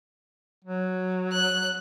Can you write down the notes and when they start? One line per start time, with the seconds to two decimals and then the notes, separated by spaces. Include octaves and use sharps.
0.64 F#3
1.33 F#6